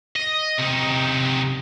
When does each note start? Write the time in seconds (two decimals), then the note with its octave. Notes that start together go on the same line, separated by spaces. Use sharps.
0.16 D#5
0.59 C3 D#4